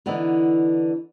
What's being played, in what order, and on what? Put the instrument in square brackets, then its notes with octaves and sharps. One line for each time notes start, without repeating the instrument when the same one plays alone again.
[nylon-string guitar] D3 E3 B3 D#4 E4